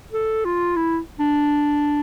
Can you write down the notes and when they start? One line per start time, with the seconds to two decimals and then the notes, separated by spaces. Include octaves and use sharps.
0.12 A4
0.45 F4
0.76 E4
1.19 D4